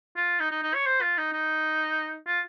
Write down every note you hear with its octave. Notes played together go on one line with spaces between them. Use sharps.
F4
D#4
D#4
D#4
C#5
C5
F4
D#4
D#4
F4